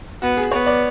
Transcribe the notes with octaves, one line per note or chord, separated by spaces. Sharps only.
B3 F#4
G#4
B3 C#5
D5